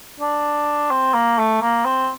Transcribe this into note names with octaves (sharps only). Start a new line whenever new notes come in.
D4
C4
A#3
A3
A#3
C4